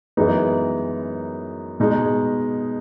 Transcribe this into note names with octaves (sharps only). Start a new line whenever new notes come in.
F#2 E3 G#3 B3 D#4
B2 G#3 D#4